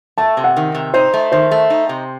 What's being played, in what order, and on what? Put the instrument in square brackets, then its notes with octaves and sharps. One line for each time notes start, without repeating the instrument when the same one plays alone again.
[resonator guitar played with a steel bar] A3 [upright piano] A5
[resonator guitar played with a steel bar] C3
[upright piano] F#5
[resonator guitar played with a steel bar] D#3
C3
[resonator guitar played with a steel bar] D#4 [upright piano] C5
[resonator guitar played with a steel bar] A3
[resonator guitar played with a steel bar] D#3 [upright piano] C5
[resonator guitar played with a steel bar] A3
D#4
C3